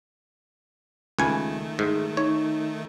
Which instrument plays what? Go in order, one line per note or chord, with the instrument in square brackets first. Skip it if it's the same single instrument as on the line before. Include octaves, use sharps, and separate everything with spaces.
[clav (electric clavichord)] C#2 G#5 [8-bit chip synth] D#3 A3
[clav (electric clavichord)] G#2
[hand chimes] D#4 [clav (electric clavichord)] C#5